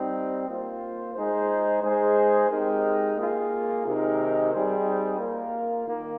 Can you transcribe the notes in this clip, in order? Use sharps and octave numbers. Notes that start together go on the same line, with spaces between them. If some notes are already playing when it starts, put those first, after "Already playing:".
Already playing: G3 C4 D#4
A#3 F4 C5
G#3 D#4 G#4 C5
G#3 D#4 G#4 C5
G#3 C4 D#4 G4 A#4
A#3 F4 G#4
C3 D#3 G#3 D#4 A#4
G3 C4 D#4 G#4 C5
A#3 F4 A#4
D#3 A#3